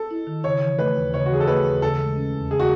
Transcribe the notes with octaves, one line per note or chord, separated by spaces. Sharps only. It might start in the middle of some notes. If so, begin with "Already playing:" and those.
Already playing: A4
E4
D#3
C#3 C#5
E3
A3 B4
D#2
C#3 C#5
F#4
E3 G#4
A4
A3 B4
D#2
C#3 A4
G#3
C#4
E2
C#3 G#4
F#4